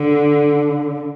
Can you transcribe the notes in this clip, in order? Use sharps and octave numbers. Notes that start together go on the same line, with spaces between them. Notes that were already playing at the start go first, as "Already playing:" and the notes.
Already playing: D3